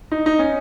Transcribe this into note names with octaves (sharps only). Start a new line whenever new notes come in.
D#4
D#4
C#4